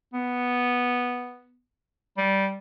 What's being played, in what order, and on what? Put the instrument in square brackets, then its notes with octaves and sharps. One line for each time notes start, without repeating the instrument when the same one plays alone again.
[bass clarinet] B3
G3